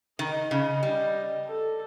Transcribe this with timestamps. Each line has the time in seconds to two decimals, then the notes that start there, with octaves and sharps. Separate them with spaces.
0.19 D#3 D#5
0.51 C#3
0.83 G3
1.47 A4